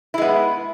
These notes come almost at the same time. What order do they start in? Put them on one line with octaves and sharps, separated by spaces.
E4 G#3 B3